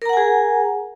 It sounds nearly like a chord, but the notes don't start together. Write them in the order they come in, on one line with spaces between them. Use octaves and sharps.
A#4 A#5 F#5 G#5 G#4